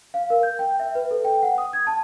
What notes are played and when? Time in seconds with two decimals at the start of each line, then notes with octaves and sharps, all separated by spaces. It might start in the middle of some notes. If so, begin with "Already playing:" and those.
0.14 F5
0.30 A#4
0.43 G6
0.59 G5
0.80 E5
0.95 B4
1.11 A4
1.25 G5
1.43 F#5
1.58 D#6
1.73 G#6
1.87 A5